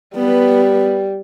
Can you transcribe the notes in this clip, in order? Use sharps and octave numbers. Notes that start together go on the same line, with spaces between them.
G3 B3 B4